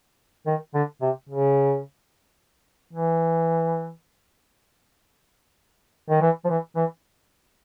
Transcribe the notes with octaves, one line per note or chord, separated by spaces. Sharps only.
D#3
D3
C3
C#3
E3
D#3
E3
F3
E3
E3